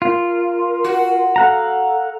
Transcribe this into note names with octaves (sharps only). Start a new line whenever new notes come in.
F4 A#4
F#4
A4 F5 F#5 A#5